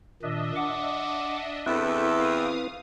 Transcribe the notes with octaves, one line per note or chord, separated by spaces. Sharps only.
A#2 D#3 D4 D#5 E5
F#5 D6
E2 C4 E4 A4 B4 E5 G5
F5 D#6